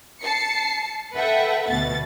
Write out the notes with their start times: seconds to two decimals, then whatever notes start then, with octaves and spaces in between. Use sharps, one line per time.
0.24 A5 C7 C#7
1.16 A4 B4 E5 F#5 G5
1.69 D2 B2 A6